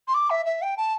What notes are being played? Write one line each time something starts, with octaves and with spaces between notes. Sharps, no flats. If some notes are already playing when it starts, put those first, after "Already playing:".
C6
D6
E5
E5
G5
A5